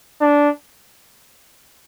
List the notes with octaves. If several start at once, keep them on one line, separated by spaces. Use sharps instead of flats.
D4